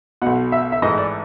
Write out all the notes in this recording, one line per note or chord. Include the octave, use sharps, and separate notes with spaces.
B1 B2 F#5
E5
E5
A1 G#2 E3 D#5
D5